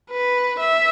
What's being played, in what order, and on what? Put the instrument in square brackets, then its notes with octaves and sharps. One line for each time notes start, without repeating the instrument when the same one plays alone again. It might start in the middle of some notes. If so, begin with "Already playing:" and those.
[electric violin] B4
E5